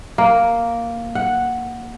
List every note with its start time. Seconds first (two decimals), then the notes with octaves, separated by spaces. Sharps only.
0.18 A#3
1.15 F#5